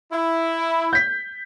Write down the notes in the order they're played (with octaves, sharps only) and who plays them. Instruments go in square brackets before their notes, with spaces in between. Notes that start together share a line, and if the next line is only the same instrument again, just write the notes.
[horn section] E4
[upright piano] G6 B6